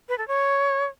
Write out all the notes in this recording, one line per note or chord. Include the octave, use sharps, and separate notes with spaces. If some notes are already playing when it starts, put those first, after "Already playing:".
B4
A4
C#5